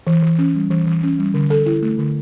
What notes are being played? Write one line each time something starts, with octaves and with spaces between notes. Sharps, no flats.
E3
E3
C#4
G3
E3
E3
C#4
G3
D3
A4
E4
A3
D3